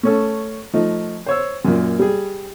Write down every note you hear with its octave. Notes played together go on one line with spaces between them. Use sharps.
A3 C#4 A4
F3 A3 D#4
C5 C#5 E6
F#2 A#2
G3 G#4